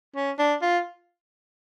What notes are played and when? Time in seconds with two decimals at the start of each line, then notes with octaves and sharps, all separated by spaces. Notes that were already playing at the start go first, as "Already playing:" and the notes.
0.16 C#4
0.39 D4
0.62 F4